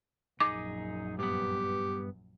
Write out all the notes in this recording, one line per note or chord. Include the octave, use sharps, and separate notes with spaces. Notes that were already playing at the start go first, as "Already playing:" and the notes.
A#1 F#2 D#4 G#4 D6
G2 B3 G4